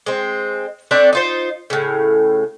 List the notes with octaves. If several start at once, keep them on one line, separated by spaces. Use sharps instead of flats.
G#3 C4
A3 C4 D4 D5
D#4 F4 C5
A2 C#3